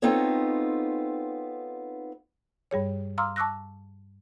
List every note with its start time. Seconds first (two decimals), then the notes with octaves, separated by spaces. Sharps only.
0.02 B3 C4 D#4 F4 A4 C#5
2.71 G2 G3 G#4 C#5
3.18 F5 A#5 C6 D6 E6 F6
3.36 A5 C#6 D6 E6 F#6 A#6